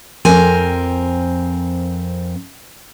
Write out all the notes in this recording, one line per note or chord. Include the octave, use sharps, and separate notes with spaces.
F2 C4 A#4 G#5